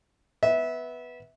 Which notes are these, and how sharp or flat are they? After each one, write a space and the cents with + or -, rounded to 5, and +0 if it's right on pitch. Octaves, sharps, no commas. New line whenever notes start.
B3 +0 E5 -20